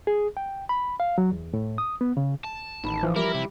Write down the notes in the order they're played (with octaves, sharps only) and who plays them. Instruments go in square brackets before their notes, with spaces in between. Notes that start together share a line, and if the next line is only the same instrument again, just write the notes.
[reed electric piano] G#4
G5
B5
F5
F#3
E2
A2
D#6
B3
C#3
[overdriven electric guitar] A5
[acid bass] A1 [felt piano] D#3 B5
[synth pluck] E3 F3
[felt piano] G3 [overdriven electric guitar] E4 [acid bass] A#4 [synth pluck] D6
[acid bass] C3